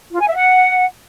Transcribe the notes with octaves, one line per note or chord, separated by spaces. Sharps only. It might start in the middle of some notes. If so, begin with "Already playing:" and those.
F4
G#5
E5
F#5